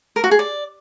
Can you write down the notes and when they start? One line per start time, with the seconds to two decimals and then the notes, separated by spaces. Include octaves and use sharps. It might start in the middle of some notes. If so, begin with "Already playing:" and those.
0.16 A#4
0.24 F#4
0.31 G#4
0.39 D5